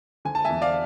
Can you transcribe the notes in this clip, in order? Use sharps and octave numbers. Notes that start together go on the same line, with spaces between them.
D3 G#5
A5
E2 E5 G#5
D5 F5